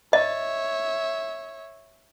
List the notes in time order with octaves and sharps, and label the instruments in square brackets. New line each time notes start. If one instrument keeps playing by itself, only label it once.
[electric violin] C#5 E5 [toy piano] D#5